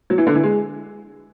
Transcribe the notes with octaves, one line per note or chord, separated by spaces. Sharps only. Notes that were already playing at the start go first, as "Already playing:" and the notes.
F#3
E3
D3
E3
G#3